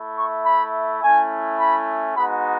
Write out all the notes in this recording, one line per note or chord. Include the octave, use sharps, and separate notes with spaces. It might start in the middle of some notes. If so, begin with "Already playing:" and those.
Already playing: A3 E4
C#6
B5
A3 C#4 E4 G#5
B5
G#3 B3 D#4 F#4 B5